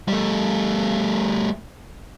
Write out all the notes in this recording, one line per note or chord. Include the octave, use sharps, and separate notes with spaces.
G3 A3